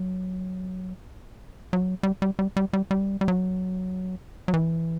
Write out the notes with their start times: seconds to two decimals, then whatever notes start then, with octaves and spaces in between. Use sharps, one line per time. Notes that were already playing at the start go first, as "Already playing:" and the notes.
Already playing: F#3
1.73 F#3
2.03 G3
2.22 G3
2.39 G3
2.57 G3
2.73 G3
2.91 G3
3.21 G3
3.28 F#3
4.48 F#3
4.54 E3